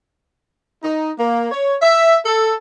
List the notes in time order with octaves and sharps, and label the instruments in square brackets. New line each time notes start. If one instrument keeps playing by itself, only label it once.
[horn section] D#4
A#3
C#5
E5
A4